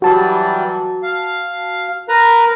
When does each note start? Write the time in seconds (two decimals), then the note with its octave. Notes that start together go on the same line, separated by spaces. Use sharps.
0.02 E3 F#3 G3 F#4 A5
1.03 F5
2.09 A#4 B4 A#5